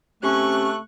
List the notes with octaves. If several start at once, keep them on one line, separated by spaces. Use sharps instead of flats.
C3 A3 C#4 G#5 C#6 F#6